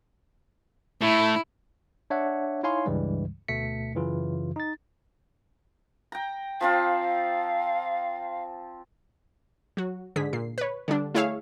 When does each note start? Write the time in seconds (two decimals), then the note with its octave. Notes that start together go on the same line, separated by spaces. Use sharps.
1.01 A2 E4
2.10 D4 C#5 E5 F#5
2.63 D#4 E4 C#5 F5 G#5 C6
2.86 C#2 G2 C#3 E3 G3 G#3
3.48 D2 B2 A3 B6 C#7
3.95 F#2 C#3 E3 F4
4.56 D#4 A6
6.12 G5 A#5
6.61 F3 C4 F4 F5
9.77 F#3 F#4
10.16 G#2 D3 G#4 B6
10.33 A#2 C7
10.58 B4 C#5
10.88 D3 G3 D4
11.14 A3 E4 G#4 C#5 E5 F5